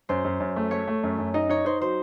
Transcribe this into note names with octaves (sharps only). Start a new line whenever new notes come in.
F#2 C5
F#2
F#2
A3
A3 C#5
A3
F#2
F#2
D#4 D#5
D#4 C#5
D#4 C5
F#3 C5